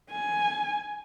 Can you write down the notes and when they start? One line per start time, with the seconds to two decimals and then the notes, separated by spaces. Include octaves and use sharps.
0.11 G#5